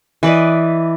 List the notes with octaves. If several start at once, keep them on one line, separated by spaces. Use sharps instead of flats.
E3 B4 D5 D#5